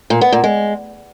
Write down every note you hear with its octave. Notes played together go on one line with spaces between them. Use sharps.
A#2
B3
A#2
G#3